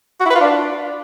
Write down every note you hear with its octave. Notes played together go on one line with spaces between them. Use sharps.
F#4
E4
B4
F4
D4